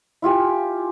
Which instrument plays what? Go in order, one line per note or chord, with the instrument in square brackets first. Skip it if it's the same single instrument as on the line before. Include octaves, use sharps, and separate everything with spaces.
[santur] E4 F4 G4 G#5